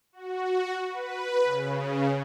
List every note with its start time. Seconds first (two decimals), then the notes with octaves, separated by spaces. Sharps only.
0.13 F#4
0.88 B4
1.44 C#3